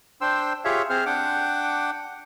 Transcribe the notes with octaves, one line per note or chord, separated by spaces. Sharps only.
D4 C5 G5 C6 E6
F4 G4 G#4 C#5 E5 F5
C4 G#4 C5 F6
D4 F#5 G5 D6